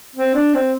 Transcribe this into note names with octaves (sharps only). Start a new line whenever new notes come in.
C4
D4
C4